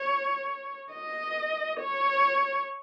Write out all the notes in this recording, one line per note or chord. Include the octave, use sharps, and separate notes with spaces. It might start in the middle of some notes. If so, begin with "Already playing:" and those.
Already playing: C#5
D#5
C#5